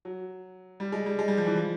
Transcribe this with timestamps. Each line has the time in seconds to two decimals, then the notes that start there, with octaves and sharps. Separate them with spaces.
0.05 F#3
0.80 G3
0.92 G#3
1.06 G3
1.19 G#3
1.28 G3
1.37 F3
1.46 E3
1.56 F3